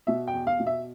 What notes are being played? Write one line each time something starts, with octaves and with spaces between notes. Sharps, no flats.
B2 E5
G5
E2
F5
B2
E5